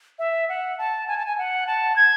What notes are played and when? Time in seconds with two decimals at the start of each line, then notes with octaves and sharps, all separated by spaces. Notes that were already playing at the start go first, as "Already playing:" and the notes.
0.19 E5
0.49 F#5
0.78 A5
1.08 G#5
1.17 A5
1.26 G#5
1.38 F#5
1.67 A5
1.96 G#6